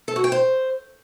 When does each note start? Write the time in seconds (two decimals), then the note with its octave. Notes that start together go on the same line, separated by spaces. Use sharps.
0.08 A4
0.16 F#4
0.24 G5
0.32 C5